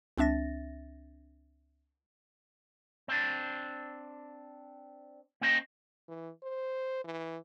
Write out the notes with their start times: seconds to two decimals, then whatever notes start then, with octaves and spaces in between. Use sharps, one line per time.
0.18 C#2 C4 D4 E5 A6 A#6
3.08 C4 D4
5.41 A#3 C#4 C5 D#5 G5
6.08 E3
6.43 C5
7.04 E3